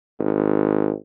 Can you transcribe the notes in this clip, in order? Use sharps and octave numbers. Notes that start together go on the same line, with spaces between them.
G#1